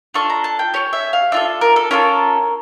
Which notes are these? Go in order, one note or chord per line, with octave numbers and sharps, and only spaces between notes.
D4 F4 A4 C#6
A#5
A5
G5
C#4 G4 C#5
E5
F5
D4 F4 A4 E5
A#4
A4
C#4 F4 A4 A#4